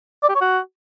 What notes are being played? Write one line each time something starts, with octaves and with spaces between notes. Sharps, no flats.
D5
G4
C#5
F#4